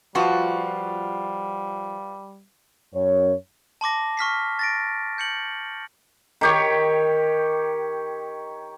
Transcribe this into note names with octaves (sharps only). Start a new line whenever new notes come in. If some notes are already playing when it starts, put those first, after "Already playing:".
F3 G3 F4 F#4 B4 F5
F#2 C#5
A5 C6 D6 A#6
C#6 F6 B6 C7
A6 A#6 D7
G6 C#7 F#7
D#3 G4 C#5